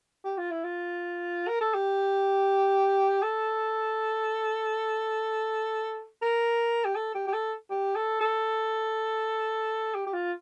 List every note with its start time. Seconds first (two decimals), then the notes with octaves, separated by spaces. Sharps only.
0.25 G4
0.38 F4
0.51 E4
0.64 F4
1.48 A#4
1.61 A4
1.74 G4
3.23 A4
6.22 A#4
6.85 G4
6.96 A4
7.15 G4
7.27 G4
7.34 A4
7.71 G4
7.96 A4
8.21 A4
9.94 G4
10.07 G4
10.13 F4